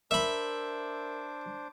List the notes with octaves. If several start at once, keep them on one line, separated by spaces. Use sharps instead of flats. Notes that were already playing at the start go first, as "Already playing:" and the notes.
D4 A#4 C5 E5 B5 D6